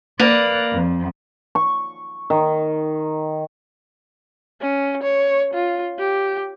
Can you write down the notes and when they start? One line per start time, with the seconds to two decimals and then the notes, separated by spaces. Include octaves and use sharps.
0.19 A#3 B4 D5
0.72 F2
1.55 C#6
2.30 D#3
4.61 C#4
5.03 C#5
5.54 F4
5.99 G4